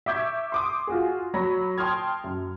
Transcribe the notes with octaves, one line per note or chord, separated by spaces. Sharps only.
E5 C#6 D6 E6 G6 G#6
C6 D6 D#6
F4 F#4 G#4
F#3 C#5 B5 A#6
G5 A5 C6 D#6 F6 G#6
F#2